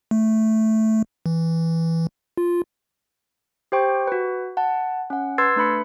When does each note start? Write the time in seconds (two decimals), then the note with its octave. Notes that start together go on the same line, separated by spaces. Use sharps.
0.11 A3
1.26 E3
2.37 F4
3.72 G4 C5 G5 C#6
4.07 F#4 B4
4.57 F#5 A5
5.10 C#4 F#5
5.38 B4 C6 E6 G#6 A6 C7
5.56 A3 D4 B4 B5 C#7